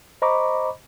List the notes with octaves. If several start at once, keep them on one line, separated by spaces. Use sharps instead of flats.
C5 D#5 A#5 B5 C#6 D6